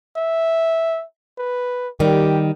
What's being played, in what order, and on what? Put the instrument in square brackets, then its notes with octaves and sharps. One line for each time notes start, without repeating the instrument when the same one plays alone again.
[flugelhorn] E5
B4
[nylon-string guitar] D#3 G3 [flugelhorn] G4